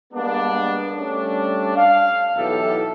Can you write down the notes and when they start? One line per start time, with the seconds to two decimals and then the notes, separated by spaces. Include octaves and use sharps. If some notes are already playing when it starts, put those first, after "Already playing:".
0.13 G3 G#3 A#3 B3 D4
0.95 G3 A3 C#4 D4
1.75 F5
2.35 B1 B2 E3 E4 G4 A4